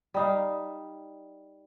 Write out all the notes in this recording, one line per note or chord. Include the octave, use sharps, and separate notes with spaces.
G3 D#4 F5